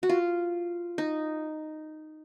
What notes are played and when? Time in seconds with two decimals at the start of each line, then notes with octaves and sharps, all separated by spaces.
0.03 F#4
0.09 F4
0.98 D#4